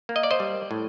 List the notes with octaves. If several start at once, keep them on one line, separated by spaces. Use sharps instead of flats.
A#3
D#5
D5
C5 D#5
G3
A2